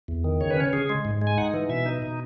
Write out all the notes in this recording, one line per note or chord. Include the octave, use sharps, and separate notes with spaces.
E2
D#3
C#3 C#5
B4
C#4 C#5
C#3 G#4
G#3
G#2
G#3
G#5
D#4 F#5
E3
B2 E5
D#4
B2